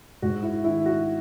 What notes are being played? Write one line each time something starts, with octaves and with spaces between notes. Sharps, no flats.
G#2 F#4
E4
D#3 E4
F#4